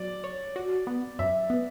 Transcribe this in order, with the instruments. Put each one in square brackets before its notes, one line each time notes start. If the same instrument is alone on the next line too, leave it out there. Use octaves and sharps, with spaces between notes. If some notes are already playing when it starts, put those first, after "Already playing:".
Already playing: [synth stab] F#3 [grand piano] D5
[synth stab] C#5
F#4
B3
[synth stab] F#2 [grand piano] E5
[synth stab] B3